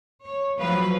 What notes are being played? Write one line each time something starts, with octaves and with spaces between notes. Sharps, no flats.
C#5
F3 F#3 B4 F5